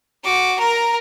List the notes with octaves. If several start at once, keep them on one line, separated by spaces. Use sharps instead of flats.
F#4 D6
A#4 A#5